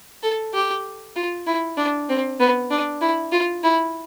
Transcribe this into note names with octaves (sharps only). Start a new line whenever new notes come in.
A4
G4
F4
E4
D4
C4
B3
D4
E4
F4
E4